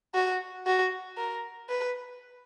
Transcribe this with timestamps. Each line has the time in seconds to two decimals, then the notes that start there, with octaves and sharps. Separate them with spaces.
0.15 F#4
0.66 F#4
1.17 A#4
1.69 B4